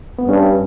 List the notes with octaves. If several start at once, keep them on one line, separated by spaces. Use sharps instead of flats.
B3
G2 C#4